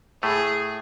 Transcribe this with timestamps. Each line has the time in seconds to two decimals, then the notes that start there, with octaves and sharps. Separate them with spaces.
0.22 A2 A3 G#4